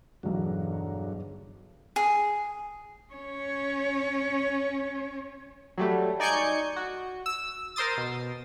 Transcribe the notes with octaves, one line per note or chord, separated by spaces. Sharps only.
B1 E2 G2 D3 F#3 F#4
G#4
C#4 C#5
F#3 G3 A3
D#4 D5 G#5 C#6 G6 C#7
F#4
E6
A#4 C5 C6 D#6 A6
B2